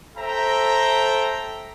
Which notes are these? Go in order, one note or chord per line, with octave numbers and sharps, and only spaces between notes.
A4 C5 E5 G5 A#5